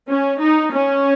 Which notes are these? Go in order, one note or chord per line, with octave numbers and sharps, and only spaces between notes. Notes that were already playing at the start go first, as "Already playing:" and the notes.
C#4
D#4
C#4